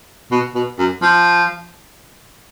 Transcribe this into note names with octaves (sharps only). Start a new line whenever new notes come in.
B2
B2
F#2
F3